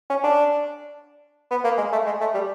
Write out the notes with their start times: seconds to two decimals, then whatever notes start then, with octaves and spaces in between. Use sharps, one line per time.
0.10 C#4
0.24 D4
1.51 B3
1.64 A#3
1.78 G#3
1.93 A3
2.06 G#3
2.21 A3
2.34 G3